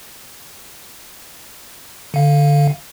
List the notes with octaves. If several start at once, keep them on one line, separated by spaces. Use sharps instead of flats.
D3 F5